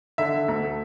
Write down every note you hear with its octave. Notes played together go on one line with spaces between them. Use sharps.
D3 E5
D3
D2
A3